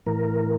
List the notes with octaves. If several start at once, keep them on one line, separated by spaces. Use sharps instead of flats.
A2 E3 A#4